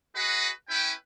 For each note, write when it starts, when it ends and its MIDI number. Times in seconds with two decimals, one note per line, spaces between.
0.16 0.50 66
0.16 0.50 68
0.16 0.50 71
0.16 0.50 75
0.16 0.50 78
0.69 0.92 61
0.69 0.92 64
0.69 0.92 71
0.69 0.92 79